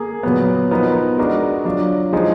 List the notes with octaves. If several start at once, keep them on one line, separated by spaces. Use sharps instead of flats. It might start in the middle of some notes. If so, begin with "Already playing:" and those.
Already playing: A#3 G#4
A#2 F#3 B3
F3 B3 D#4 A#4
G#3 D4 F#4 A#4
F#3 D4 F4
F3 G#3 D#4 G#4